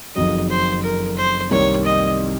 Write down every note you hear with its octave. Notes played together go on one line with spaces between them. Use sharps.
F#1 F2 D#3 F#3 D#5
C5
A#4
C5
C2 C3 D#3 A#3 C#5
D#5